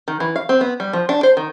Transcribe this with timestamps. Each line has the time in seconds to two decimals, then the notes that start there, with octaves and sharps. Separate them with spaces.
0.08 D#3
0.20 E3
0.36 F5
0.49 C4
0.61 B3
0.80 G3
0.93 F3
1.09 D4
1.23 C5
1.37 D#3